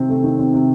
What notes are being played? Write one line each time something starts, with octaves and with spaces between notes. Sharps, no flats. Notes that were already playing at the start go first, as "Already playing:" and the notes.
Already playing: C3 D#3 C4
A3
D#3
C4
C3